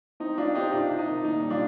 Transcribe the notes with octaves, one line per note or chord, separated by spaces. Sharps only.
C4 D#4
C4 D4 F4
C4 D#4 G4
C3 D4 F4
C3
D#4
D#3
A#2 D#4
G3
D4 F4